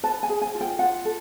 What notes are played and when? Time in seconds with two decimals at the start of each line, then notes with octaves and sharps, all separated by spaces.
0.03 B4 A5
0.23 G#5
0.29 G#4
0.42 G#5
0.55 F4
0.61 G5
0.79 F4 F#5
1.05 A4